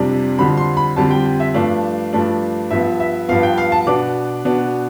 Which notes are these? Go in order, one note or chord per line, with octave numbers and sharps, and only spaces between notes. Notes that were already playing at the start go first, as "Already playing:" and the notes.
Already playing: F2 C3 G3 D4
F2 D3 G3 C4 B5
C6
B5
F2 D3 G3 C4 A5
G5
G5
E5
G2 F3 A3 D4 F5
G2 F3 A3 D4
G2 F3 B3 E5
E5
G2 F3 B3 F5
G5
F5
A5
B2 B3 D4 D6
B2 B3 D4